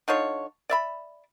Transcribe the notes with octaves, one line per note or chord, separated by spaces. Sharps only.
D3 D#4 F4 C#5
D5 E5 B5